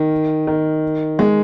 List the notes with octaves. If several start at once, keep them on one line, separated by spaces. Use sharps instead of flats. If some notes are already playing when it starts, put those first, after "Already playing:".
Already playing: D#3
D#3
G#3